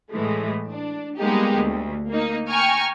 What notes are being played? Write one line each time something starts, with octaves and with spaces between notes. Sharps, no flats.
A2 E3 G#3 A3
D4
G3 G#3 A#3 B3 D#4 G4
D2
A#3 D#4
G5 G#5 A#5 C#6 F6